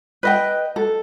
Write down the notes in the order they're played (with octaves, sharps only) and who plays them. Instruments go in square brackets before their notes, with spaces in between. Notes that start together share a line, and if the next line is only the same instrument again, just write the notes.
[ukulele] B4 D#5 G5
A4